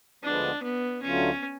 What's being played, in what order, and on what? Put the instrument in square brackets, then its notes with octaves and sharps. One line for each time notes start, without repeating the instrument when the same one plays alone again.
[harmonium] D2 D3 F3 G#3 B3 [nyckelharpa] D4
[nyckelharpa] B3
[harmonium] D2 D3 F#3 A3 F4 [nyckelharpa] C#4